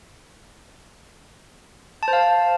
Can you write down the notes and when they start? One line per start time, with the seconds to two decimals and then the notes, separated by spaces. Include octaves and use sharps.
2.03 A5
2.08 C5
2.13 F5